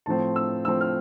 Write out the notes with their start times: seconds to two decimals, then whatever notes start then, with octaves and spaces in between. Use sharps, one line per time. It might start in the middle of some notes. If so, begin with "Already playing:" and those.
0.06 A2 F3 C4 A5
0.36 E6
0.65 A2 F3 C4 E6
0.81 F6